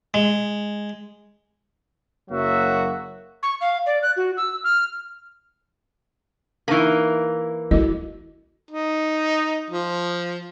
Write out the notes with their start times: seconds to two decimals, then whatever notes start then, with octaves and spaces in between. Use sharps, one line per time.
0.14 G#3
2.30 F#1 F#3 A#3 F#4 E5
3.43 C#6
3.61 F5
3.86 D5
4.02 F#6
4.17 F#4
4.37 E6
4.64 F6
6.68 E3 A#3 D4 D#4 C#6
7.71 E4 F#4 A4 D#5
8.71 D#4
9.70 F3